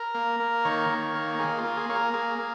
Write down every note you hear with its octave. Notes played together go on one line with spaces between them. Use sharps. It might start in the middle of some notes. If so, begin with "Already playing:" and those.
Already playing: A#4
A#3
A#3
D#3 C#5
D#3
A#3
A#3 G#4
F4
A#3
G#4
A#3 C#5
A#4
A#3 G#4
A#3